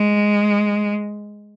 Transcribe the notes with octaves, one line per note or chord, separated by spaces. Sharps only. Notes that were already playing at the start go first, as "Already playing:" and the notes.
Already playing: G#3